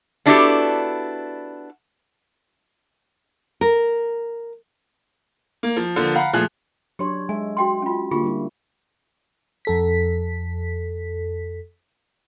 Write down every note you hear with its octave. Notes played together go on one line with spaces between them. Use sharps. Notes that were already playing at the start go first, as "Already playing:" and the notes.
B3 D4 E4 F#4 G4 A4
A#4
A#3
F3
D3 F3 A#3
F5 F#5 A#5 B5
A#2 F3 A3 G#4 F#6
F#3 D4 G4 C#5 C6
G#3 G#4 E5 G#5
F#4 G5 C6
C#4 F4
D3 A#3 F4 G4 G#4
G3 E4
F2 A4 B6